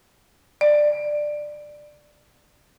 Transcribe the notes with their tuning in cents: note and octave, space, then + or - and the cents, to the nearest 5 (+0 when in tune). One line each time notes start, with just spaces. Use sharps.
D5 +15